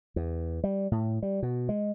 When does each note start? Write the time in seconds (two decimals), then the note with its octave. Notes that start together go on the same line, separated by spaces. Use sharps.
0.16 E2
0.64 G3
0.92 A2
1.23 G3
1.43 B2
1.69 G#3